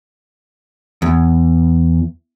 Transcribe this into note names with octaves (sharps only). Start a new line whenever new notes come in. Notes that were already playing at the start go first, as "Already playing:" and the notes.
E2